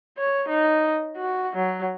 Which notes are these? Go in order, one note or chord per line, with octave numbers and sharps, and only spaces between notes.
C#5
D#4
F#4
F#3